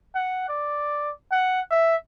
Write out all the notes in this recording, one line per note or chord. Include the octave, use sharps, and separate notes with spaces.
F#5
D5
F#5
E5